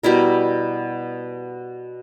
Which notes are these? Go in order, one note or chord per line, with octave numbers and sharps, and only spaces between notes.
B2 G3 E4 A#4